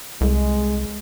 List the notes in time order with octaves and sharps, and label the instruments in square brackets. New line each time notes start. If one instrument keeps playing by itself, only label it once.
[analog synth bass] C2 [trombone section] G#3